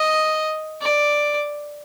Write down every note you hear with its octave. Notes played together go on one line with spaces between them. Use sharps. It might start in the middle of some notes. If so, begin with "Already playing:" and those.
Already playing: D#5
D5